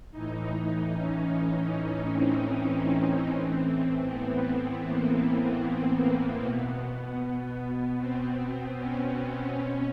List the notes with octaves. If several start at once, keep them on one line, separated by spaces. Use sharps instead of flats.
A2 E3 D#4
C#4
C#4
C4
C4
A2 E3
B3
A#3
B2 B3
C4
C#4
B2